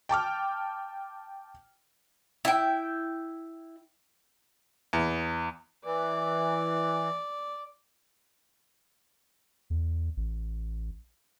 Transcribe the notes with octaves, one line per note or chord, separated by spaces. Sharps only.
G5 A5 D6 F6
E4 G5
E2
E3 D5
E2
A1